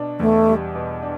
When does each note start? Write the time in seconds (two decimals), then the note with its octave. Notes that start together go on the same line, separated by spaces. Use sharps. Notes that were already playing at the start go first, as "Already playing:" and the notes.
Already playing: B2 D4
0.20 E2 A3
0.48 G3
0.75 B2
1.03 D4